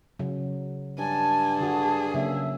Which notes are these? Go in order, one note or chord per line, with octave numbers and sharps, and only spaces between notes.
C#3 F#3
G2 G#5 A5
D3 F#4 G#4
C#3 F#3 A#3 E5